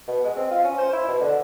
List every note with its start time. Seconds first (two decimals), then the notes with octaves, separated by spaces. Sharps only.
0.08 B2
0.24 G#3
0.37 C4
0.51 F4
0.64 C#4
0.78 C5
0.93 E4
1.08 B2
1.21 D3